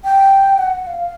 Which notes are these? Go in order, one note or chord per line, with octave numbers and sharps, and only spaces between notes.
G5
F#5
F5